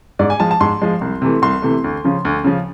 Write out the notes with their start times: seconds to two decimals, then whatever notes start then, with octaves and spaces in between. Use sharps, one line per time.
0.19 G#2 D5
0.30 G#5
0.40 F3 G#3 A5
0.51 A5
0.60 G#2 C6
0.82 F3 G#3
1.01 C2
1.22 C3 E3 A3
1.42 C2 C6
1.62 C3 E3 A3
1.84 D2
2.04 C#3 F3
2.25 D2
2.44 C#3 F3